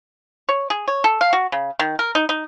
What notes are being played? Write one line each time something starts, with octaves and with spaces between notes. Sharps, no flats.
C#5
G#4
C#5
A4
F5
F#4
C#3
D#3
A#4
D#4
D#4